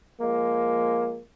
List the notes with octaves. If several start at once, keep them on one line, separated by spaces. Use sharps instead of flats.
F3 G#3 A#3